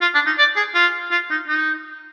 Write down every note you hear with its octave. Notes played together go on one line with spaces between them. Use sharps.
F4
D4
D#4
D5
G#4
F4
F4
D#4
D#4